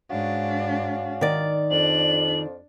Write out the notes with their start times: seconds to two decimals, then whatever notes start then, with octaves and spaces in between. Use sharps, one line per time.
0.11 G#2 C#4 D4 F#4 F5
1.21 D#3 D5
1.71 F2 D4 F#7